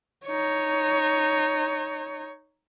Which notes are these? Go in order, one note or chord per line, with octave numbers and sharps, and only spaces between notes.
D#4 C#5